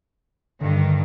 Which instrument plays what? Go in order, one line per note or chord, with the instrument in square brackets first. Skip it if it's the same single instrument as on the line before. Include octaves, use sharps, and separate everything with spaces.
[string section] G2 D#3 [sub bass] D3